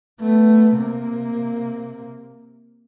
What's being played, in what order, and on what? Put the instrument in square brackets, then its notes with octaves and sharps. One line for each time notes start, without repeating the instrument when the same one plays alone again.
[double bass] A3 B3
C3 A#3